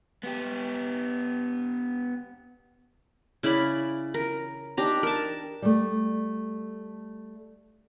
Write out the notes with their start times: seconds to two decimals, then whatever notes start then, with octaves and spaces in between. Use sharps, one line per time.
0.23 B3 G4
3.43 C#3 E4 D5 B5
4.14 A#4
4.77 D4 D#4 G4 A#5
5.03 A#4 A5
5.62 G3 A3